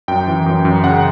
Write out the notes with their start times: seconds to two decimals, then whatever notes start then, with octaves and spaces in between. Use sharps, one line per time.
0.08 F#2 G5
0.27 E3
0.46 F#2
0.65 F#2
0.84 C#3 F#5